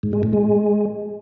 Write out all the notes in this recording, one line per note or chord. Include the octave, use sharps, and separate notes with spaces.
G#2
G#3
A2
G#3